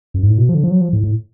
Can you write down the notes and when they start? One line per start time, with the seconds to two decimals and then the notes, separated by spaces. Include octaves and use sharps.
0.14 F#2
0.23 G#2
0.30 A2
0.38 B2
0.49 F3
0.55 D3
0.64 F3
0.71 F#3
0.81 F3
0.93 A2
1.03 A2